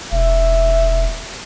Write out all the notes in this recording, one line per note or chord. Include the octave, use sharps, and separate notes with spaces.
E1 E5